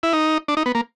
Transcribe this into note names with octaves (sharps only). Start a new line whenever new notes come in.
E4
D#4
D4
D#4
B3
A#3